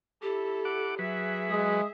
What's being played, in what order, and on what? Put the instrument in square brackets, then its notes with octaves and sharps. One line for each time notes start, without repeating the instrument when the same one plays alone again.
[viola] E4 A4 [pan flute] G4
[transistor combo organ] F#5 D6
[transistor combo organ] F#3 B4 [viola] G#4 E5
[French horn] G#3 [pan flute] D#6